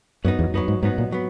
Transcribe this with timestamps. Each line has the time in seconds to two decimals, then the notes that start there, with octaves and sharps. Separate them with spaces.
0.24 F#2 F#3 B3 D#4
0.39 E2
0.54 F#2 F#3 B3 D#4
0.68 G#2
0.83 G#2 F#3 B3 D#4
0.98 A#2
1.12 F#3 B3